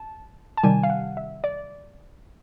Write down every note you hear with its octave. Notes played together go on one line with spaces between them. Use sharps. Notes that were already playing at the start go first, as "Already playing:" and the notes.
Already playing: A5
A5
C3 D#3 G3 G#5
F5
F#5
E5
D5